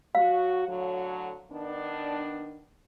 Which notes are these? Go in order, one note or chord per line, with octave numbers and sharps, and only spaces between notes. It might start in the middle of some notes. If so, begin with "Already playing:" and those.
F#3 F#4 F5
A2 D3 F#3
D#3 B3 D4